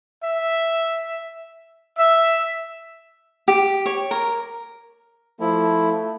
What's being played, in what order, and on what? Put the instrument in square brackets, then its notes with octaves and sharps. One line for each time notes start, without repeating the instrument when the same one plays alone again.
[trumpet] E5
[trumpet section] E5
[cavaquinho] G4
C#5
A#4
[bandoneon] F3 E4 [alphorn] A3